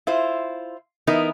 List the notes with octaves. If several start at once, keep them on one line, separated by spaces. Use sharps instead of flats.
E4 F4 C5
E3 B3 D#4 E4 A#4